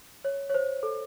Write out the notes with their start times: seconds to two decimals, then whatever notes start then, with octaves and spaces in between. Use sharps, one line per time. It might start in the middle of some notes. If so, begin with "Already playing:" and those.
0.25 C#5
0.50 C#5
0.54 C5
0.83 A4